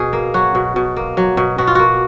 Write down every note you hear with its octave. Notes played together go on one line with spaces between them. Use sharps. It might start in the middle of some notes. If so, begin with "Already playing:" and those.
Already playing: B2 G#4
A#3
F#3 F#4
B2
B2
A#3
F#3
B2
B2 F#4
F4
A#3 F#4